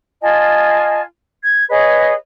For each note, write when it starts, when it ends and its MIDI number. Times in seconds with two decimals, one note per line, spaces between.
0.21 1.00 65
0.21 1.00 75
0.21 1.00 80
0.21 1.00 81
1.42 1.64 92
1.69 2.12 68
1.69 2.12 71
1.69 2.12 73
1.69 2.12 75